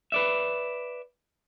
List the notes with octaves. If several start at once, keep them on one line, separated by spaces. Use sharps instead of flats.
B4 D5 E5